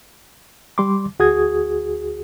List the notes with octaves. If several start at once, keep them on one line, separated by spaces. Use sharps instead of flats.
G3 C6 D6
D2 F#4 G#4 D#6 G#6